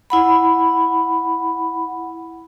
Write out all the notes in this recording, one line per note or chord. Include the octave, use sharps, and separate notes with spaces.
E4 F#5 B5